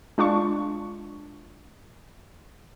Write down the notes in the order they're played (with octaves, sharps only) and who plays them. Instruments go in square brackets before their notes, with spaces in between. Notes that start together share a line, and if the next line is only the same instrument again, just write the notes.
[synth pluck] G#3 D4 F4 C#6